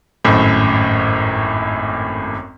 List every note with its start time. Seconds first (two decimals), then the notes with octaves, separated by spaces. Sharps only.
0.25 G#1 F#2 A2